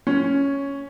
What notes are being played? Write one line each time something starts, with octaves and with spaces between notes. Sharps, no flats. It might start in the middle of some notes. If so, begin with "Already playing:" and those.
C#4